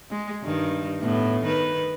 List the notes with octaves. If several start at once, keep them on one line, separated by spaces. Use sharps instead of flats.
G#3
G2 D#3
A2 B3
D#3 B4